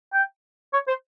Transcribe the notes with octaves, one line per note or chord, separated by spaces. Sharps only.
G5
C#5
C5